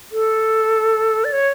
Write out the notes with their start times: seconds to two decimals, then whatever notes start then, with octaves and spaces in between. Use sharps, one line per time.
0.12 A4
1.24 D5
1.33 C#5